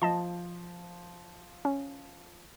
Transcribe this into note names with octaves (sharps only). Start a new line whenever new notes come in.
F3 D#5 A5 C6
C#4